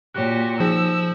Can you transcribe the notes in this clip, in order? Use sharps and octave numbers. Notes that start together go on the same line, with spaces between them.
A#2 F#4 G4 C#5 F#6
F3 D#4 G#4 E6